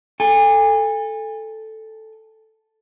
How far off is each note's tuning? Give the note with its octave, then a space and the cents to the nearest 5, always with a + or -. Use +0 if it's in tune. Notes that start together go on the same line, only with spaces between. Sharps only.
A4 +0 G#5 -35